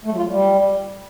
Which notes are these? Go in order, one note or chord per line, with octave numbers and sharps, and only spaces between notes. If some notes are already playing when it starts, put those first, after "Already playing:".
A3
F#3
F4
F#3
G3